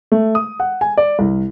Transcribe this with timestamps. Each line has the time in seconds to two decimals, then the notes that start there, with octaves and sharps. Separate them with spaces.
0.12 A3
0.35 D#6
0.60 F#5
0.81 G#5
0.97 D5
1.19 C2